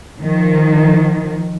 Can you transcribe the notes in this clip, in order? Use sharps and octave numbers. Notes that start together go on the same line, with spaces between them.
D#3 F3